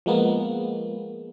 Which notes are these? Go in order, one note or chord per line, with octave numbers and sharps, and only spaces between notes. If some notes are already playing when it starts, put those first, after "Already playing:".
F3 G#3 A#3 B3